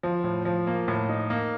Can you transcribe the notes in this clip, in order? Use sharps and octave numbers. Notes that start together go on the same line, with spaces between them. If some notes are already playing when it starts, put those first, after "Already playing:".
F3
A2
F3
A#3
A2
D#4
A#3